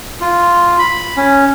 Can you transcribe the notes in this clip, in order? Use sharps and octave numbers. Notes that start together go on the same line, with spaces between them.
F4
B5
C#4